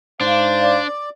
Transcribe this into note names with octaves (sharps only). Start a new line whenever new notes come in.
G#2 D4 C5 F5
D5